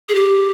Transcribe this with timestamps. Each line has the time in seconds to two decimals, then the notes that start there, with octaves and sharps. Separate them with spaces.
0.09 G#4
0.15 G4